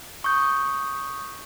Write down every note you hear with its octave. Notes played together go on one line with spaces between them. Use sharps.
C#6 D#6 G6